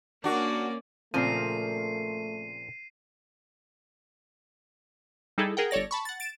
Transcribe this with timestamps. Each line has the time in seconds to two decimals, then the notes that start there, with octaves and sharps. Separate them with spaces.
0.24 A#3 C#4 D4 F#4 D5
1.14 A#2 C#3 F3 A3 C4 A#4 C7 D#7
5.38 G3 D#4 E4 G#4 A4
5.57 G#4 A#4 F#5 G5
5.71 G1 A4 C#5 D5 A#6
5.91 A5 B5 C#6
6.05 F#5 A6
6.20 A6 D7 E7